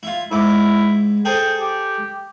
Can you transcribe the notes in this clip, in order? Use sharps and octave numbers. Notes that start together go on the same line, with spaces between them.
E4 F4
G#2 E4 D6
G#4 A4 C5 G5
G4